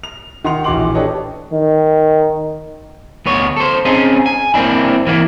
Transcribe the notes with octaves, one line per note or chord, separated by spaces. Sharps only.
F7
D#3 F#5 C6 F7
A#1 E3 F#4 C6 D6 F#7
D4 G4 A4 B4 C#5 D#5
D#3
D2 B3 C#5
A4 C5
C4 C#4 D#4 G#4
G#5
A#3 C4 D4 E4
E3 A#3 E4